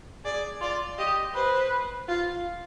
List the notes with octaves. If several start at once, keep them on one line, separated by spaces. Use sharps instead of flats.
G#4 D5
F4 D5
G4 D#5
B4 C5
F4